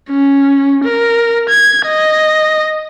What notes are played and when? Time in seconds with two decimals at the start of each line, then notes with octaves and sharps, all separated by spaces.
0.10 C#4
0.85 A#4
1.49 G#6
1.86 D#5